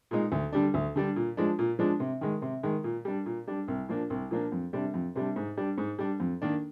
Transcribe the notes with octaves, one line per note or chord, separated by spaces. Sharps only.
A#2 G#3 D#4
D2
D3 G3 D4
D2
D3 G3 D4
A#2
F3 G#3 D4
A#2
F3 G#3 D4
C3
D#3 G#3
C3
D#3 G#3
A#2
G3 D4
A#2
G3 D4
C2
A#2 F3 A#3 D4
C2
A#2 F3 A#3 D4
F2
C3 G3 D4
F2
C3 G3 D4
G#2
G3 D4
G#2
G3 D4
F2
D#3 A#3 D4